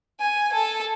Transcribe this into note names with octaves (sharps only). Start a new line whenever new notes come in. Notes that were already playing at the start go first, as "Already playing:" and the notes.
G#5
A4